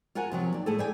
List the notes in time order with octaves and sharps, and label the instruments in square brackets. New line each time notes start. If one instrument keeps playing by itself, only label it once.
[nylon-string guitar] F4 F#4 A#4 F#5 G#5
C3 F3 F#3
D#2 D5
A2 A3 G#4 A4
F#2 D5 G5 G#5